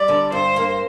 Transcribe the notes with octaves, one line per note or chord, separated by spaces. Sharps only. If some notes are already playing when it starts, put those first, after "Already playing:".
Already playing: G3 D5
D3
G2 C5
A#3